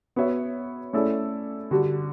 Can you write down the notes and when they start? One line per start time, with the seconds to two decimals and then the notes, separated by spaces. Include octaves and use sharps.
0.16 B3 F#4 C#5 E5
0.93 A3 C#4 E4 A4 D5
1.71 D3 G3 D4 F#4